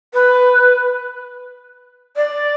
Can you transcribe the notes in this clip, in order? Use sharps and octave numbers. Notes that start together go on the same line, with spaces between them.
B4
D5